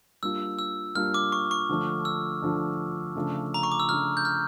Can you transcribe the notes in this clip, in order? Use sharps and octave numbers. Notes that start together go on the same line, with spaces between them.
G3 A#3 D4 F4 E6
E6
G3 A#3 D4 F4 F6
D6
C#6
C#6
D3 F3 A3 D4
E6
D3 F3 A3 D4
C#3 F3 A3 D4 F4
A#5
C#6
D6
E6
C#3 F3 A3 D4 F4 F6
G6
F6